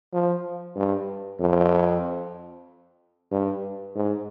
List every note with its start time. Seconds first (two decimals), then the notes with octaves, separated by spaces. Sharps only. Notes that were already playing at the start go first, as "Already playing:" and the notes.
0.13 F3
0.76 G2
1.40 F2
3.32 G2
3.95 G#2